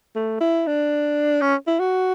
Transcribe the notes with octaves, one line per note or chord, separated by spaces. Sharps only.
A3
E4
D4
C#4
E4
F#4